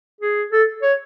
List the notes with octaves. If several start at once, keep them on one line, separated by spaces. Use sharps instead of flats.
G#4
A4
C#5